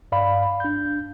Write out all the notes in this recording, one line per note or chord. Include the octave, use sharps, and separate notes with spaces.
G2 D5 F5 B5
D4 G6